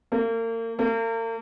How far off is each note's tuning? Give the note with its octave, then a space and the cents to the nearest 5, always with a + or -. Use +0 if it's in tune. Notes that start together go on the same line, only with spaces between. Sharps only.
A#3 -35
A#3 -40